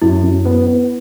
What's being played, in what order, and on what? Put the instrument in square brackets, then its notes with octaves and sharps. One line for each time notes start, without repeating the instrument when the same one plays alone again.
[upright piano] F#2 [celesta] E4
[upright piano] F#2
B3
B3